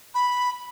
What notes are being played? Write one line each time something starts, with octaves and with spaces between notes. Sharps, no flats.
B5